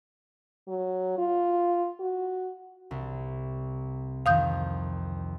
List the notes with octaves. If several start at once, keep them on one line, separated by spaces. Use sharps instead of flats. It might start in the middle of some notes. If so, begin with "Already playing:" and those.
F#3
F4
F#4
C2
F2 D#3 F5 D#6 G6